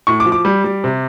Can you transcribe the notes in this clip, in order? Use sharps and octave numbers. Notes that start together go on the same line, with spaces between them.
A2 C#6
D6
F3
D6
G3
G3
C3